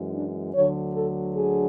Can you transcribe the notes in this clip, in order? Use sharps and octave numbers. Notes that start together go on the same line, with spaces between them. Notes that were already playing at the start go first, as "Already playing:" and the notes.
Already playing: F#2 E3 G#3
D4
D2 D3 F#3 C#5
A4
G#4